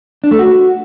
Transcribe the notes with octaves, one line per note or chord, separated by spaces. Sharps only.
D4
A3
F#4